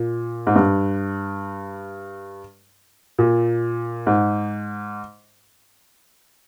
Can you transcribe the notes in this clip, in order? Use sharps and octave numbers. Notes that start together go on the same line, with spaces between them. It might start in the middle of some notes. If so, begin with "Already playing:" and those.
Already playing: A#2
G#2
G2
A#2
G#2